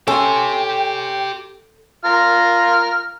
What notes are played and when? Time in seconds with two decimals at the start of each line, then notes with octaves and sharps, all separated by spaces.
0.08 C#4 G4 A4 G5 C6
2.05 F4 A#5 F6